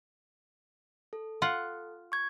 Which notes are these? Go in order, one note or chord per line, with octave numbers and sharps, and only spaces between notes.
A4
F4 F#5
C#6 G#6